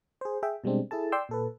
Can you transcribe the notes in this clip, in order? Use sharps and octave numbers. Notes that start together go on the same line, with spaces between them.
G#4 C5
G#4 E5 G5
B2 G3 G#3 C4 D4
E4 G#4 A4 A5
D5 G5 C6 E6
A#2 A4 B4